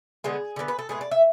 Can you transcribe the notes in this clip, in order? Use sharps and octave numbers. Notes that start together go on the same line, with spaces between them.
D3 G#3 B3 G#4
D3 G#3 B3
B4
A4
A2 G#3 B3 G#4
D5
E5